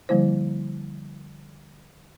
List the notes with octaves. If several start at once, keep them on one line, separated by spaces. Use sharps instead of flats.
D3 F3 G3 A#3 E4 C5